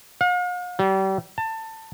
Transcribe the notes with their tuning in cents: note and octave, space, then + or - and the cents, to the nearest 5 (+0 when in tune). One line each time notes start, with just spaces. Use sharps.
F5 +45
G3 -35
A5 +25